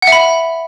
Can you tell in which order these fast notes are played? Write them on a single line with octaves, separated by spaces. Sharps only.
F#5 E5 B5